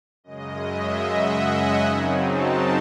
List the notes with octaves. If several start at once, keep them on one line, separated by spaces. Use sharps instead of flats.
F#2 C#3 G#3 D#5
E5
F#5
G#5
F#2 C#3 F#3 C4 D#4
A5